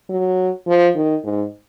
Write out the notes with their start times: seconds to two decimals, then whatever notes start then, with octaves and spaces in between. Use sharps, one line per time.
0.10 F#3
0.67 F3
0.95 D#3
1.24 G#2